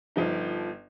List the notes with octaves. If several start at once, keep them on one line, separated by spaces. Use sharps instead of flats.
G1 F3 D#4